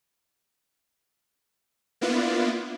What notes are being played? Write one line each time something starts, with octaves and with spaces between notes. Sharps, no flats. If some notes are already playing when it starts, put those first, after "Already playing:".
A#3 B3 D4 E4 F4